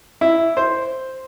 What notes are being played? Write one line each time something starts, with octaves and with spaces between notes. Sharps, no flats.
E4
C5